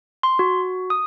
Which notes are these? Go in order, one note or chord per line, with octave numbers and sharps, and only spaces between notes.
C6
F#4
D#6